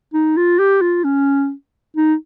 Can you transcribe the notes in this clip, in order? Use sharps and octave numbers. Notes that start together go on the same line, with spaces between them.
D#4
F4
G4
F4
C#4
D#4